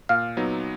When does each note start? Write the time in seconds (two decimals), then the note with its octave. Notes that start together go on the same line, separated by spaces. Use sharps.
0.09 A#2 F5 F6
0.37 F#3 B3 D#4